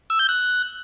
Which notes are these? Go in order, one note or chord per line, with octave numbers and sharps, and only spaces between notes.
E6
G6
F#6